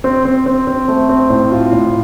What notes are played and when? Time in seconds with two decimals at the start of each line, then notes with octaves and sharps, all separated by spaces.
0.04 C4
0.25 C4
0.46 C4
0.67 C4
0.88 A3
1.09 C4
1.30 A2
1.51 F4
1.72 A2